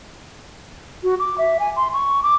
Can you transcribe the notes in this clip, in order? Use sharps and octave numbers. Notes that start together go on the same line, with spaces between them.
F#4
D6
E5
G#5
C6
C#6
D6